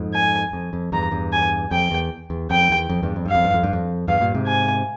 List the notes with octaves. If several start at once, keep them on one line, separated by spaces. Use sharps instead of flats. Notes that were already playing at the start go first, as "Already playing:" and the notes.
Already playing: F2 G#2
G#5
F2
F2
E2 G2 A#5
E2 G2
G#5
F2 G5
E2
E2
F2 G5
E2
F2
E2 G2
F2
G2 F5
F2
G2
F2
G2
F2
E2 G2 F5
G2 A#2
G#2 C3
G#5